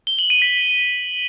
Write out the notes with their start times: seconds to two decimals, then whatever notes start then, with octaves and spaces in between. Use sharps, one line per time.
0.07 G7
0.19 F#7
0.30 D#7
0.42 B6